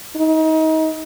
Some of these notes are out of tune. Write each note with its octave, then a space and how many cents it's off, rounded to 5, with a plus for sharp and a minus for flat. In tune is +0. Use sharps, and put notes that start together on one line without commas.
D#4 +30